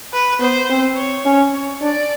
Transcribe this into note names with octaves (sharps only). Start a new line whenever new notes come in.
B4
B3 C5
C4
C#5
C#4
C#5
D4 D5